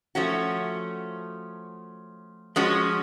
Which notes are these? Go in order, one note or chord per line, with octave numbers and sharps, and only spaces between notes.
F3 A3 C#4 F#4
F3 G#3 C#4 F#4